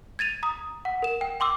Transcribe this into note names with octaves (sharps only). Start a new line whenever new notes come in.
G#6 A6 D#7 F7
A#5 D#6
F#5
A#4 E7
G5
G5 C6 D6 E6